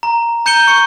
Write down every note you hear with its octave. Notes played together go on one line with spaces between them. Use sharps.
A#5
A#5 G6 C#7 D#7 G7
C#6 C#7